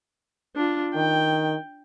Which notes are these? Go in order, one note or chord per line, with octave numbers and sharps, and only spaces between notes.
D4 F4
D#3 G5